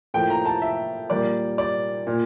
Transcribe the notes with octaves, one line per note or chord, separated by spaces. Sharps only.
A2 F3 A#3 G5
A#5
A5
E5
A#2 G3 A#3 D5
D5
A#2